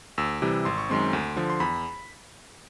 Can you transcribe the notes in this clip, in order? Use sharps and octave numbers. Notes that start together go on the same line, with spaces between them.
D2 E6
C3 E3 G3
G#1 C6
C#6
F#2 D#3 G#3 C4 C6
D2
D3 F3
C6
E2 B5